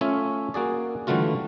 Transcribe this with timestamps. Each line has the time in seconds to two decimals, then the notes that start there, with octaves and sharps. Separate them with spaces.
0.01 A3 C#4 F4 C#5 E5
0.54 A#3 F#4 G#4 D5
1.07 D3 E3 G3 A3 F4 F#4